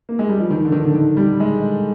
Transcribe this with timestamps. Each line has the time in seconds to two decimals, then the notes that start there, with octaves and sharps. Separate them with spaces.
0.09 A#3
0.19 G#3
0.29 G3
0.40 F3
0.50 D#3
0.65 D3
0.72 D#3
0.85 D3
0.94 D#3
1.17 G3
1.40 G#3